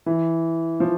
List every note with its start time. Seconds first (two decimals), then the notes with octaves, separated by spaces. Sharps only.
0.06 E3
0.80 F3